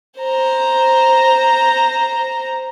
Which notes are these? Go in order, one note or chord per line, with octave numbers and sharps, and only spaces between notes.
C5 A#5